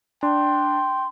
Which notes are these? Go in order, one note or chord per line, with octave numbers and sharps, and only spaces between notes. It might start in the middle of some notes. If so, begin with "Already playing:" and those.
D4 G5 C6